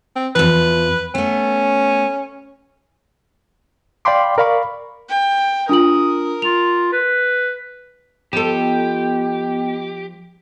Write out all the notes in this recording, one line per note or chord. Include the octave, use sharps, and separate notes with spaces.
C4
E2 F3 B4
A3 B3 C#4
D5 F5 G5 B5 C6 D6
A#4 D5 F5 B5 C#6
G5
D4 F4 A#4 D#6 F#7
F4 F7
B4
F3 B3 G4 A4 D#5 G5